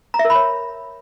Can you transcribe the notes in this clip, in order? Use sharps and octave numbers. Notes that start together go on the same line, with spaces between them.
A#5
E5
A#4
B5
C#5